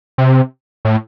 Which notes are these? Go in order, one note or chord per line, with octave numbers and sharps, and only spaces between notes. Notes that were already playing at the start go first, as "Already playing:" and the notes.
C3
A2